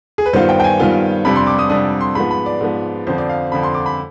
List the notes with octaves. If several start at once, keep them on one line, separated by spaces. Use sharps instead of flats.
G#4
B4
G2 D#3 B3 F4 C5
G5
G5
G#5
G2 D#3 B3 F4
F2 C3 G3 D4 B5
C6
D6
D#6
F2 C3 G3 D4 D#6
C6
G#2 F3 B3 B5
B5
D5
G#2 F3 B3
F2 D3 F3 C5
D5
F5
F2 D3 F3 B5
C6
D6
B5